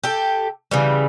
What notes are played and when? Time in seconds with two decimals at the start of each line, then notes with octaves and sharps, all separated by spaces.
0.04 G4 A4
0.71 C#3 E3 G3